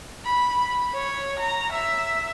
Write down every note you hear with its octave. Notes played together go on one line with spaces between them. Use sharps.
B5
C#5
A#5
E5